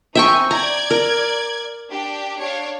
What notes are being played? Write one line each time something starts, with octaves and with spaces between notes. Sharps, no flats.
C4 D#4 E5 G5 G#5 C#6
D5 A#5 G#6
A#4
D4 G4
D4 C#5 F5